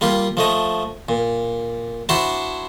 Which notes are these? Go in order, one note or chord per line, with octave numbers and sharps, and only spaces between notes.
G3 A#3 F4 G4
F3 A3 D#5
A#2
D4 E4 F#4 C5 F#5 A5